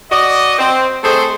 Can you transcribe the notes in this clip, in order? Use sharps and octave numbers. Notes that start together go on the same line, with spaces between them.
F#4 D5 D#5
C4
A3 C4 G#4 C5 D#5